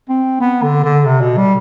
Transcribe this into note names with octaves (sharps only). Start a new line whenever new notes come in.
C4
B3
D3
D3
C3
B2
G3